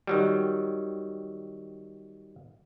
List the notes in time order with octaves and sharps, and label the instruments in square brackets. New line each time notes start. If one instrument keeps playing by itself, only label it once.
[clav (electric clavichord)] D#3 F#3 G3